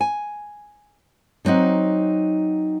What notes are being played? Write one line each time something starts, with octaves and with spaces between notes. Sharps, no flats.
G#5
D3 F#3 C4 D#4 F#5